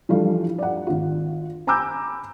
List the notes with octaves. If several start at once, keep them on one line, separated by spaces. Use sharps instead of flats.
E3 F3 G3 A3 D4 F4
D5 F#5
G#1 F4
G#5 A#5 B5 D6 E6 G6